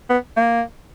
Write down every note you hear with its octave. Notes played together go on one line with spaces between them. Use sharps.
B3
A#3